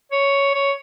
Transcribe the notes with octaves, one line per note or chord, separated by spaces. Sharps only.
C#5
C#5